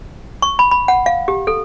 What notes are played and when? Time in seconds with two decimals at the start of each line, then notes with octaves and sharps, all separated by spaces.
0.42 C#6
0.59 B5
0.71 B5
0.88 F#5
1.06 F5
1.28 G4
1.47 A4